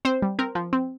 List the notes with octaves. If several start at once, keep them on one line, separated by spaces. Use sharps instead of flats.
C4 C5
G3
C4 A#4
F3
C4